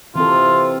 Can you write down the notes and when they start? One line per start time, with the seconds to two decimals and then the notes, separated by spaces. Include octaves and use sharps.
0.16 C3 E3 C4 F4 A4